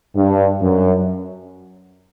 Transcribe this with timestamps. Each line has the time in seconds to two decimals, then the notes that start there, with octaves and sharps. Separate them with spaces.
0.16 G2
0.61 F#2